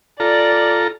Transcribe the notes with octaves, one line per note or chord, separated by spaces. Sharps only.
F4 A4 D5 A#5